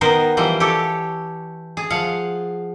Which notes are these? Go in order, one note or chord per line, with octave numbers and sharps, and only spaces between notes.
D#3 B3 A#4 C5
E3 F3 G3 C5
G4 A4 C#5
G#4
F3 F5 F#5